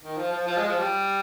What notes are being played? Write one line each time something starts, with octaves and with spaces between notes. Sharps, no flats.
D#3
F3
F3
F3
G#3
F3
G3